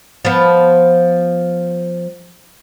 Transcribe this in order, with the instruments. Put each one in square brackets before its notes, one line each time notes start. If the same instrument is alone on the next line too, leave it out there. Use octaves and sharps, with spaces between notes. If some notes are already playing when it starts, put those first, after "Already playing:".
[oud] F3 B3